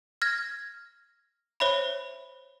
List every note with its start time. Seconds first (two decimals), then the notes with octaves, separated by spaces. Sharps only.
0.22 F6 G#6 A#6
1.60 C5 C#5 E5 B5